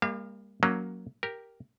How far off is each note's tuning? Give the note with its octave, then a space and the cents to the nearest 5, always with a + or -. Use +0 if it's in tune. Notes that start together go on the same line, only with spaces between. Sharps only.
G3 +40 A#3 +0 F5 -35
F#3 +0 A#3 +0 C#4 +10
G4 +0 A#4 +0